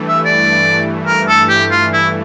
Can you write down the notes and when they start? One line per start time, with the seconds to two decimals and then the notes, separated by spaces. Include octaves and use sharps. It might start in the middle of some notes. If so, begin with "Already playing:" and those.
Already playing: G2 E3 A3
0.08 E5
0.25 D5
1.06 A#4
1.28 A4
1.49 G4
1.71 F4
1.93 E4